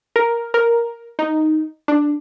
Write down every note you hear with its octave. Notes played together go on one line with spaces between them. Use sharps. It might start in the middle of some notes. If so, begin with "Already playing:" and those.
A#4
A#4
D#4
D4